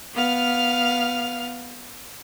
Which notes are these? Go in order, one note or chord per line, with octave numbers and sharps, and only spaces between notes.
B3 F5 F6